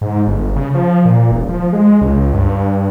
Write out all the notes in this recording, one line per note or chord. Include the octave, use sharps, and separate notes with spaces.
G#2
G1
C#3
F3
A#2
E1
F3
G#3
C#2
G2